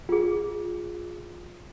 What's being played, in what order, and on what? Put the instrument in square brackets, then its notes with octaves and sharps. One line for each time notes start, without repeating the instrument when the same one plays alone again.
[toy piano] F4 G#4